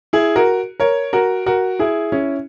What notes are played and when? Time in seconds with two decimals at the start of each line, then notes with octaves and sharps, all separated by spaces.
0.13 E4 G#4
0.36 F#4 A#4
0.80 A#4 C#5
1.13 F#4 A#4
1.46 F#4 A#4
1.79 E4 G#4
2.12 C#4 E4